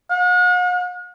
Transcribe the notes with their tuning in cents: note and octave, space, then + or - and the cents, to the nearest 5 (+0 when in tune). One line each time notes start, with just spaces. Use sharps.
F#5 -45